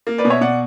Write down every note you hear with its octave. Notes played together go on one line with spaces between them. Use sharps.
A#3
B4 D5
B2
C#5 E5
B2 D5 F#5